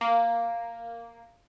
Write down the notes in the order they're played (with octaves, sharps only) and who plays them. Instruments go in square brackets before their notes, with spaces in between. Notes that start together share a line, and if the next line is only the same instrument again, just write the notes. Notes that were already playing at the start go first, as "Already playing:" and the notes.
[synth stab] A#3